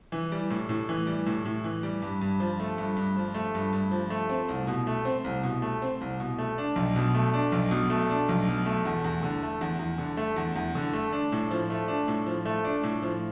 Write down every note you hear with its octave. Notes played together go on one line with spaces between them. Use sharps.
E3
G3
A2
A2
E3
G3
A2
A2
E3
G3
G2
G2
F3
A3
G2
G2
F3
A3
G2
G2
F3
A3
C4
C2
B2
A3
C4
C2
B2
A3
C4
C2
B2
A3
D4
B1
B2
A3
D4
B1
B2
A3
D4
B1
B2
A3
E2
E2
D3
A3
E2
E2
D3
A3
E2
E2
D3
A3
D4
A2
F3
A3
D4
A2
F3
A3
D4
A2
F3